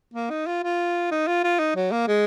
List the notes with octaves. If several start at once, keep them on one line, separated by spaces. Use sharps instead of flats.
A#3
D#4
F4
F4
D#4
F4
F4
D#4
F#3
A#3
G#3